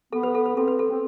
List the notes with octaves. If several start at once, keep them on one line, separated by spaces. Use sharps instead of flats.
B3 A4
B4
A4
B4
C4 A4
B4
A4
C4